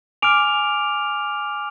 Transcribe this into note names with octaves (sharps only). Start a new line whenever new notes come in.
G#5 D6 F6 D7 F7